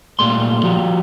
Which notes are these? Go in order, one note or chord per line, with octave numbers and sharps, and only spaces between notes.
A#2 G3 A3 C6
F3 F#4 G4